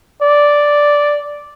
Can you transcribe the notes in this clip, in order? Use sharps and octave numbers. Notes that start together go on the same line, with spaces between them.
D5